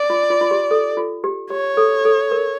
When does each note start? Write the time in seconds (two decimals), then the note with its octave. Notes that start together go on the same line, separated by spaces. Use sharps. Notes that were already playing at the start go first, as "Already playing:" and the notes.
Already playing: D5
0.10 F4
0.30 F4
0.41 F4
0.51 G4
0.71 A4
0.97 F4
1.24 G4
1.50 G4 C#5
1.77 A4
2.05 A4
2.31 A#4